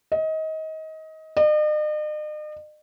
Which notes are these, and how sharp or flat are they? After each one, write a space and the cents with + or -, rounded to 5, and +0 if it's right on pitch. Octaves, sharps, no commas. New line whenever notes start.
D#5 +25
D#5 -45